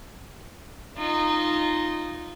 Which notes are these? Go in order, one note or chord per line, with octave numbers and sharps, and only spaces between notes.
D#4 F4